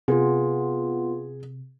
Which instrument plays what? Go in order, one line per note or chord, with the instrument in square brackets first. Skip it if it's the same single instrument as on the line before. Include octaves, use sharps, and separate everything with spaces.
[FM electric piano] C3 [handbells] B3 F4 [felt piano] G#4